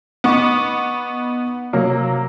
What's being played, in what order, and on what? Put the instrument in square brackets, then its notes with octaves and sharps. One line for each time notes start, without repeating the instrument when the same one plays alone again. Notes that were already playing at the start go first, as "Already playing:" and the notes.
[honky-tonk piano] B3 D#4 C#6 D6 E7
C3 F#3 A#3